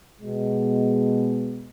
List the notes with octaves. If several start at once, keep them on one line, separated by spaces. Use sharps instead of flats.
B2 G#3